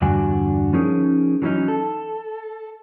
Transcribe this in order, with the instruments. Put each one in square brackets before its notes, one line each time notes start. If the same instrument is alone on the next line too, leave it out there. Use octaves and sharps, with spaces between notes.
[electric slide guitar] E2 G2 D3 D4 F#4 G#5
F3 C#4 D#4 G#4 A#4
E3 F#3 G3 C#4 D#4
A4